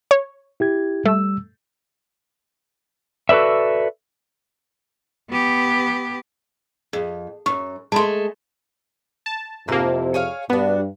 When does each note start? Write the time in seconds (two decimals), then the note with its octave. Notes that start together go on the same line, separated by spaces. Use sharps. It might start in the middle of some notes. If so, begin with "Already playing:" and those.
0.11 C#5
0.60 E4 G4 G#6
1.05 G3 A3 E6
3.29 F#4 A4 B4 D5 E5
5.30 B3 G4
6.93 F2 G#4
7.46 F#2 C#6
7.92 G#3 A3 A5 B5 C6
9.26 A5
9.68 F2 G#2 C3 A#3 E4 A5
10.14 G#4 C#5 F5
10.50 G2 B3 D4 F#4